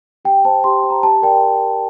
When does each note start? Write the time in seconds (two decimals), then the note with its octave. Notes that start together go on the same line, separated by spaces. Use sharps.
0.25 G4 G5
0.45 C5 A5
0.64 G4 C6
0.83 C5
0.90 A#5
1.03 G4 A5
1.22 A#4 D5 G5